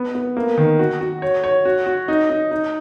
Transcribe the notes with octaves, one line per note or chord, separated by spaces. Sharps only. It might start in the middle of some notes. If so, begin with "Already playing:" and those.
Already playing: B3
B3
A#3
D#3
F#4
F#4
C#5
C#5
F#4
F#4
D#4
D#4
D#4